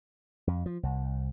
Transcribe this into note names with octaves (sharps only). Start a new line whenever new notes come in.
F2
F3
C2